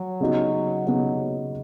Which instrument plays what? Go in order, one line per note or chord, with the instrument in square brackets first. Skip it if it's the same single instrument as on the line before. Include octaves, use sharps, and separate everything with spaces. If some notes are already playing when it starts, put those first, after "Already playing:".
Already playing: [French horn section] F#3
[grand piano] C#3 B3 D#4 F#4
C#3 B3 D#4 F#4